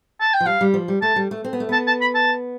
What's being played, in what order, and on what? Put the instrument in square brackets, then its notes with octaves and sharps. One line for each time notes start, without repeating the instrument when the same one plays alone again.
[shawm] A5
G5
[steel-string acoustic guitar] F3
[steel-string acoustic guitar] G3 [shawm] F5
[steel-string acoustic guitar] G3
F3
G3
[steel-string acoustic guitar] A3 [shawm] A5
[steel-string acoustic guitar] G3
A3
C4
B3
A3
[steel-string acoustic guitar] B3 [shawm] A5
[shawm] A5
B5
A5